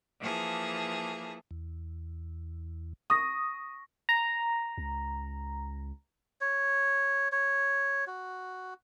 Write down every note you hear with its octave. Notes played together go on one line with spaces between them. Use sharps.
E3 F3 A#3 G#4 A4
E2
C#6 D#6 A#6
A#5
C#2
C#5
C#5
F#4